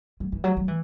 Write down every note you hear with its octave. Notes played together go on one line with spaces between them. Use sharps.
F#3
E3
F#3
F#3
E3